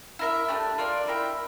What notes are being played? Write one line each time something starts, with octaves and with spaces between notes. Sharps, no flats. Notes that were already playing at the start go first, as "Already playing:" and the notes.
E4 A#4 E5
A3 D4 G4
D4 F4 A#4 D5
E4 A#4 E5 G5